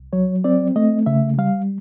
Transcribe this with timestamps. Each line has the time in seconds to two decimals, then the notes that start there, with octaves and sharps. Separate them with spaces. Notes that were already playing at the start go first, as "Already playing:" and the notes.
Already playing: C2
0.13 F#3 C#5
0.44 C4 D5
0.76 A3 D#5
1.06 C#3 E5
1.38 G3 F5